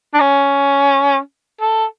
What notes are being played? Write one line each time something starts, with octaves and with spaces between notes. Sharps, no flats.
D4
C#4
A4